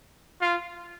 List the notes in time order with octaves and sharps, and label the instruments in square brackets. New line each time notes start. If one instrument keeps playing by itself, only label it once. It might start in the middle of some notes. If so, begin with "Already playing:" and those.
[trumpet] F4